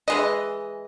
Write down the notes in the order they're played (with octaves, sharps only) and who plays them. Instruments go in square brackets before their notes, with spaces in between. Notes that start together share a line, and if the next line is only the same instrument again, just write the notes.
[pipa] E3 G#3 D#5